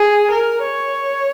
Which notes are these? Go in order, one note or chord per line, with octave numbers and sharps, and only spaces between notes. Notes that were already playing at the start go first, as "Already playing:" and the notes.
Already playing: G#4
A#4
C#5